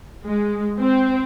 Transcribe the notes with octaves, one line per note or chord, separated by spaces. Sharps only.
G#3
C4